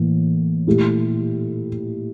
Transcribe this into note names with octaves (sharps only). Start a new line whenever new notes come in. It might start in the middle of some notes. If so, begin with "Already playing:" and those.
Already playing: A2 E3 A#3
A#2 A3 E4 G4